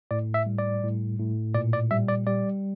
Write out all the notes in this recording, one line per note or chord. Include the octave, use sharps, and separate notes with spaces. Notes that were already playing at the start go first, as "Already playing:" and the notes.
A2 D5
E5
G3
D5
A2
A2
A#2 D5
D5
G3 E5
D5
G3 D5